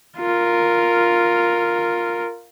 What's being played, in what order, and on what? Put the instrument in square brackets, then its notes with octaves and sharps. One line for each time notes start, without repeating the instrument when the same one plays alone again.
[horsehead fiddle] F4 A#4